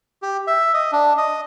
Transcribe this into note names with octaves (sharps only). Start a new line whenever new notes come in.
G4
E5
D#5
D4
D#5